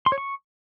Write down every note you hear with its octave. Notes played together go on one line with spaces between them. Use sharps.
C6
C#5
C#6